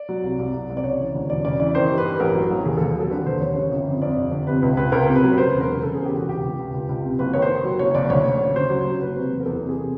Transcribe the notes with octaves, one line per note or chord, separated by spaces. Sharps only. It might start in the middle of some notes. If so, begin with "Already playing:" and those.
Already playing: D5
F#3
C2
C2
C2
C2
D5
C#3 C#5
E3
D2
E1 D5
C#3 D5
E3 D5
D#3 C5
G2
B4
G2
A1 A#4
F#3
A1
D#2 G#4
D#2 A4
G#4
F#3 A4
D3 B4
D#2 C5
D#2 C#5
C#3 C#5
G1
F2
F2 D5
G1
G1
C3 B4
C#2 B4
C#2 B4
C#2 A#4
C3
B4
F#3
B4
C#3 C5
E1
A#4
C#3
C#3 A4
E2 G#4
G4
E1 F#4
C#2 G4
C#2
C#2
C#2
C#2
C3
F#1 B4
D#3 C#5
C5
D#3
F#3
F#1 C#5
F#1 D5
D2 C#5
D2
C#5
C#3
C#3 C5
F#3
F#3
F#1 B4
C3
E2
A#4
E2 A4
C3
G#4
C3